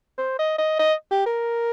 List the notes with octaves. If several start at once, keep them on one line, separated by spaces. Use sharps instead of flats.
C5
D#5
D#5
D#5
G4
A#4